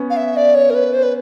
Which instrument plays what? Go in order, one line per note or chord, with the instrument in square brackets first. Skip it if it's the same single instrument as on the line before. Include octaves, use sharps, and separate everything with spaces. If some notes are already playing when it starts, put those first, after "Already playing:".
Already playing: [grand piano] B3 C#4
[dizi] F5
E5
D5
C#5
A#4
B4
C5
B4